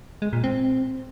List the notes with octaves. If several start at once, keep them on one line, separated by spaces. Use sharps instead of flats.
G#3
A#2
C4